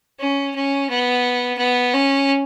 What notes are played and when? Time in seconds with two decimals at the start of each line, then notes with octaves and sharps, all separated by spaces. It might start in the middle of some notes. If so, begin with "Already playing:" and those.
0.19 C#4
0.55 C#4
0.90 B3
1.58 B3
1.94 C#4